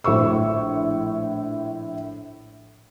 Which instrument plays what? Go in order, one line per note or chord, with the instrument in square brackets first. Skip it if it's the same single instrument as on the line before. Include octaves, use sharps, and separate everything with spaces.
[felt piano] A#1 A2 C5 C#6 E6